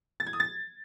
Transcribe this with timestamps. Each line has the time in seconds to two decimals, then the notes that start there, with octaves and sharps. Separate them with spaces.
0.20 A6
0.27 G#6
0.33 D#6
0.40 A6